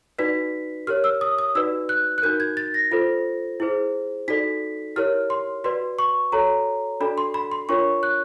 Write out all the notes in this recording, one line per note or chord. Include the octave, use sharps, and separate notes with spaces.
D#4 F#4 B4 D5 B6
G4 A#4 C#5 F6
E6
D#6
D#6
D#4 F#4 B4 D5 E6
F#6
F#6
D#4 F#4 A#4 G6
G#6
A6
A#6
F4 A4 C5
E4 G#4 C5
D#4 F#4 A4 D5 B6
E4 G4 A#4 C#5 F6
C6
F#4 B4 D5 C6
C#6
F#4 A4 C#5 A#5
D4 F#4 A4 D5 B5
C6
B5
C6
D4 F4 A#4 C#5 C#6
F#6